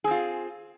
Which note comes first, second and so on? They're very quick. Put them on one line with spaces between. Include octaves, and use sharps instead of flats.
G#4 C4 F4